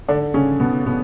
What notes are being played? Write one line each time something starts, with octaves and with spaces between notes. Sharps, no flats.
D3 D4
C#3 C#4
B2 B3
B2 B3